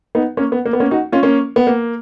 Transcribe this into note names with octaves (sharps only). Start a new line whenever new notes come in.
B3 D#4
A#3 C#4
B3
A#3
B3
A#3 C#4
D#4 F#4
C#4 F4
A#3 C#4
B3
A#3